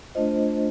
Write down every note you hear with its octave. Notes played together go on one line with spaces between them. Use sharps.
A3 D4 F4 C5 D#5